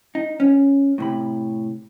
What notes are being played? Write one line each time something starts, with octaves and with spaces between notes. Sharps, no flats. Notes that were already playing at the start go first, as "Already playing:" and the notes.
D#4
C#4
A2 C3 B5